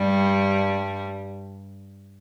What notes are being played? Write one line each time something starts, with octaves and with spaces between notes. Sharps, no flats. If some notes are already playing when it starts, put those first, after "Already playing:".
Already playing: G2 G3